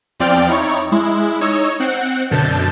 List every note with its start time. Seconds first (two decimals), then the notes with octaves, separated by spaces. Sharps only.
0.20 E2 F3 C4 D5 G5 F6
0.48 D#4 E4 C#5
0.92 G#3 E4
1.41 D#4 C#5 D#5 E6
1.80 C4 F#5
2.31 F#2 B2 D3 A5 G6